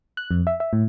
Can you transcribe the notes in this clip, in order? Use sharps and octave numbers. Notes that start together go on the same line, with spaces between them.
F#6
F2
E5
E5
A2